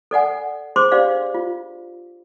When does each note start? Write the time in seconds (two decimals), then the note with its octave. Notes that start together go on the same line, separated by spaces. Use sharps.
0.11 A4 D5 F#5 G#5
0.76 G#4 C5 C6 D6
0.91 D4 G4 C5 D5 F5 C6
1.34 F4